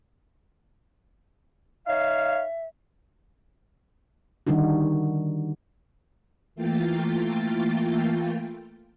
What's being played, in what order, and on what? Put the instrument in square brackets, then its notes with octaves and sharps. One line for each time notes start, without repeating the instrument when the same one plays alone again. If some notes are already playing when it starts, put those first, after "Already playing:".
[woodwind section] D#4 C#5 F5 [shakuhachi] E5
[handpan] D3 D#3 G3 D4 D#4 F#4
[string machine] E3 A3 A#3 F4 G5 A6